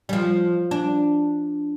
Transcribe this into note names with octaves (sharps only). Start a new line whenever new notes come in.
G3
F3
D4